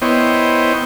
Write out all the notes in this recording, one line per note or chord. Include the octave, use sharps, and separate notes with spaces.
B3 E4 C5 C#5 D#5 G5